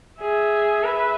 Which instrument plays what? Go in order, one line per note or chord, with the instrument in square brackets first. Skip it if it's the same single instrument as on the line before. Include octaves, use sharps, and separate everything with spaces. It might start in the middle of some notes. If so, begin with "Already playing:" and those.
[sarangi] G#4 [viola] E5
[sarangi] B4